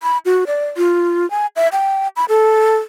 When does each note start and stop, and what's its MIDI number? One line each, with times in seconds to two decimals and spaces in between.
0.03 0.18 83
0.25 0.44 66
0.47 0.66 74
0.77 1.29 65
1.31 1.46 80
1.56 1.68 76
1.72 2.08 79
2.16 2.25 83
2.29 2.77 69